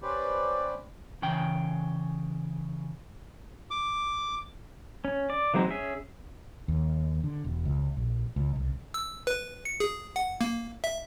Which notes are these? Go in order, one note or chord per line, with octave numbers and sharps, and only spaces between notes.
C#4 G4 B4 C5 D5
C#3 E3 G5
D6
C#4
D5
E3 F#3 G#3 C4 D#4
C#4 G#4 E5
D#2
D3
E1
C#2
A#1
C#2
C2
E6
B4
C#7
G#4
F#5
A#3
E5